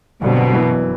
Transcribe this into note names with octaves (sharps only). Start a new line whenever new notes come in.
G1 G2 B2 D3 F#3 C4
F#2 E3 B3